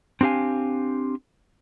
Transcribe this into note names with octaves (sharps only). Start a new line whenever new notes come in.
C4 D4 G4 F5 G#5